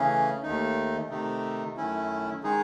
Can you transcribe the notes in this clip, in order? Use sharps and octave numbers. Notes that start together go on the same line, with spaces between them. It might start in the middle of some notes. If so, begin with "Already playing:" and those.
Already playing: C#3 E3 A3 C#4 G#4
D#2 D#3 A3 D#4
C3 D#3 A3 D#4
F#2 D#3 A3 C#4 E4
D#3 G#3 D#4 G#4